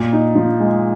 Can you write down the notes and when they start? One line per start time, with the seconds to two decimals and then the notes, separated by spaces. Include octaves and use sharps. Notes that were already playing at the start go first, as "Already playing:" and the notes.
Already playing: A#2
0.12 D#4
0.35 F3
0.60 G#3